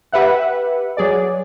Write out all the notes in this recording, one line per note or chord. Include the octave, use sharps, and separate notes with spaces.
G4 B4 E5 F#5
F#3 G#4 D5